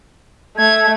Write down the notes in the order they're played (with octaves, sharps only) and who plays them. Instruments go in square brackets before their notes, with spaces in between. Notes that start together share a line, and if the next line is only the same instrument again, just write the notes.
[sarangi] A3 [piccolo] G#6